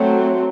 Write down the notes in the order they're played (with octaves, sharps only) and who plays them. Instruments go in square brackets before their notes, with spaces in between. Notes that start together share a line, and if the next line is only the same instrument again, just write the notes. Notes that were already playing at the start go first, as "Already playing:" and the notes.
Already playing: [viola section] F#3 A3 C4